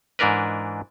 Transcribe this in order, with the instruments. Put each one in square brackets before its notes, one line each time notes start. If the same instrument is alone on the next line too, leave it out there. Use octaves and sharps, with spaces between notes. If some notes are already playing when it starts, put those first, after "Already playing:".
[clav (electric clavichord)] G#2 E3 D4 A#4 B4